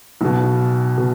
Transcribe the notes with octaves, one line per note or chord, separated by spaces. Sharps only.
B1 B2
B2